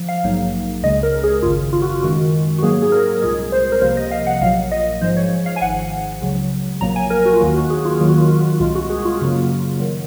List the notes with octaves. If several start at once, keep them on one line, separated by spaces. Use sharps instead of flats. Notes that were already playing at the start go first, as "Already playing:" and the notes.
Already playing: F3
F5
A#1 G#2 F#3 A#3
C#2 C#3 G#3 D#5
A#4
G#4
G#1 F#2 C#3 F4
F4
F#4
F4
F#2 D#3 G#3 F#4
F#4
G#2 F#3 A#3 G#4
G#4
A#4
C2 A#2 G#3 G#4
C5
A#4
C2 C3 F3 A#3 C5
D#5
F5
F#5
A#1 A#2 F#3 F5
D#5
G#2 F3 G#3 C5
C#5
F5
G#5
G#1 G#2 F3 F#5
C#2 C#3 F#3
A#1 A#2 F#3 A#3 A#5
G#5
A#4
F#4
F4
D#2 D#3 F#3 A#3 F#4
F#4
G#4
F4
D#2 D#3 F#3 A#3 F4
F#4
F4
C2 A#2 G#3 F4
F#4
G#4
F#4
F4
F#2 C#3 F#3 A#3
D#3 F#3